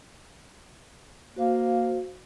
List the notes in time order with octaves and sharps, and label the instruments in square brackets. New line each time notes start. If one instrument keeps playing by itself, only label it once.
[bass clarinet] A#3 [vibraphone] F#4 C5 F5